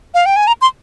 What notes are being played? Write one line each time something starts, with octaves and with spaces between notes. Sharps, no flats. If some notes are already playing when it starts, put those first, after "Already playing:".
F5
G5
G#5
A#5
C6